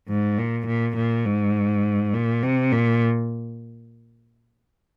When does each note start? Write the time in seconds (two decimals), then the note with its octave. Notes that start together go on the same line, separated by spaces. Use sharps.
0.09 G#2
0.38 A#2
0.67 A#2
0.97 A#2
1.25 G#2
2.14 A#2
2.43 C3
2.72 A#2